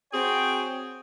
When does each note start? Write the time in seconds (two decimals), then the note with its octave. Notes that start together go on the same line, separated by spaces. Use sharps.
0.13 C4 F#4 G#4 C#5 G5